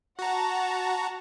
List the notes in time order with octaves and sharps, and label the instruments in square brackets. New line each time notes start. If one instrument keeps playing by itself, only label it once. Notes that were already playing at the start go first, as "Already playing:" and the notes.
[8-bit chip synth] F#4 A#5 [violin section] F#5 A5